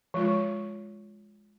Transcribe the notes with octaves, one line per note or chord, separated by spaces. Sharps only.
F3 G#3 F4